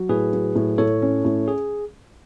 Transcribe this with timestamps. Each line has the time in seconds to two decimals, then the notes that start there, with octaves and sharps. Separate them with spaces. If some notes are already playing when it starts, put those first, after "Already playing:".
Already playing: F#3
0.09 A2 G#4 B4
0.33 F#3
0.55 A2
0.78 A2 A4 C#5
1.02 C#4
1.24 A2
1.48 G#4